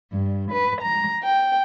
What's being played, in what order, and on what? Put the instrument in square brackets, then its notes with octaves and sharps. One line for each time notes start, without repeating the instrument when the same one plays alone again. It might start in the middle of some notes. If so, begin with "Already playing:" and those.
[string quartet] G2
B4
A#5
G5